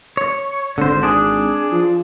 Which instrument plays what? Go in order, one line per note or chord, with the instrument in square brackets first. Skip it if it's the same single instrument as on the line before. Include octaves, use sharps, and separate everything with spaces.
[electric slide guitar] C#5
[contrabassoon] G#1 [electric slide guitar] D3 C5
[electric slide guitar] D4 G#4
[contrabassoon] F3